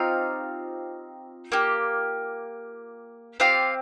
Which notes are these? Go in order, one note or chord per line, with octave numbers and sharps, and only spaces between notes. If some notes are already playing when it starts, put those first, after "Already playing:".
Already playing: C4 D#4 F4 G4 F5
A#3 G4
C4 F4 G4 F5